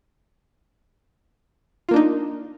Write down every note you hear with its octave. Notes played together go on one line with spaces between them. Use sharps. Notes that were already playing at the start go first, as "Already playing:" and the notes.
A#3 D4 D#4 F4